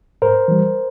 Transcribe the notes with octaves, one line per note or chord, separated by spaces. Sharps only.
G#2 A#4 C5
E3 G3